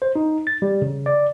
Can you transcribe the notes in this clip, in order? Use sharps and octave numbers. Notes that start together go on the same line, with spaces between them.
C5
D#4
A6
G3
C#3
D5